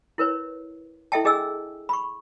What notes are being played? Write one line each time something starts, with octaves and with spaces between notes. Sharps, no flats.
E4 A#4 B4 C#5
E4 A4 D#5 E5 G5 A5
D4 G#4 D#5 G#5 E6
B5 C#6